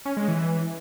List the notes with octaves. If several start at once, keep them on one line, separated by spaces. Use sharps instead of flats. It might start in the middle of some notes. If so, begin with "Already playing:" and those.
C#4
G#3
E3